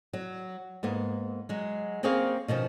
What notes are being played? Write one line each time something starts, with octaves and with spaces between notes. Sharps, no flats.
F#3
G#2 A#3 B3
F#3 G#3
A#3 C4 C#4 G#4 C#5 F5
B2 D#3 F3 C#4